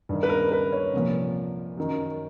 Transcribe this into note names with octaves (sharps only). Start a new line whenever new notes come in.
G2 D#3
B4
A#4
B4
C#5
C2 A#2 F3
F#2 D#3